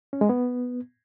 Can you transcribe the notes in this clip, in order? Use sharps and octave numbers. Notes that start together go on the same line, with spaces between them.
C#4
G#3
B3